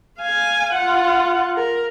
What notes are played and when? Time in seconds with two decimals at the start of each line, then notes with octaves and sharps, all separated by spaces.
0.18 F5 G#5
0.74 F4 F#5
1.56 A#4